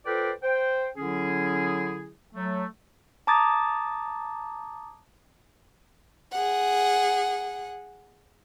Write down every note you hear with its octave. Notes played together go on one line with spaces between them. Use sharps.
F4 A4 B4 C5 D5 G5
C5 G5
D3 F#3 C#4 E4 G#4
F#3 A3
A5 A#5 D6 D#6 G#6 A6
G#4 F#5